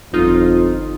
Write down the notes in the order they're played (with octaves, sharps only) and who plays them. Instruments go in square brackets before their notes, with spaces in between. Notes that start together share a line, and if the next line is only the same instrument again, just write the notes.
[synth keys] G1 D#4 F4 [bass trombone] F2